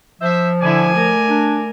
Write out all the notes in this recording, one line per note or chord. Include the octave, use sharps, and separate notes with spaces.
F3 C5 E5
D3 E4 D5 G#5
A3 A#4
D4